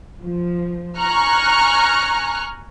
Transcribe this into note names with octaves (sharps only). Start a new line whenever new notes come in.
F3
G#5 A#5 C#6 F6 F#6